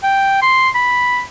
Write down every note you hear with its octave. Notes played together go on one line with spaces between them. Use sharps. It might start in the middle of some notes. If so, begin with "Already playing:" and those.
G5
C6
B5